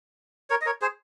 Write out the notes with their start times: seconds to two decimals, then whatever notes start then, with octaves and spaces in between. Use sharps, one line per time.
0.50 A#4 C#5
0.61 D#5
0.66 A#4 C#5
0.82 G#4 C5